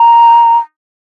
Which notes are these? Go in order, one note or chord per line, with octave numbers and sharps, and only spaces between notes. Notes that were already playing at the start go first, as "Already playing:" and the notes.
Already playing: A#5